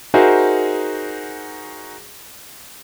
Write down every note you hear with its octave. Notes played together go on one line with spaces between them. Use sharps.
D#4 F#4 G#4 A#4 C5 E5